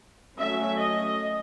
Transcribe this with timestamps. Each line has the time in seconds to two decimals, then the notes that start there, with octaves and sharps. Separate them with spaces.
0.37 F#3 A3 C#4 E5
0.78 D#5